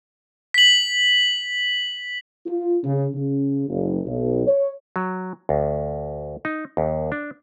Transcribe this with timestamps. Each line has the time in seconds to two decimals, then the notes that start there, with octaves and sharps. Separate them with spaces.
0.54 B6 F#7
2.46 F4
2.84 C#3
3.14 C#3
3.69 F#1
4.06 B1
4.47 C#5
4.96 F#3
5.49 D2
6.45 D#4
6.77 D#2
7.12 D4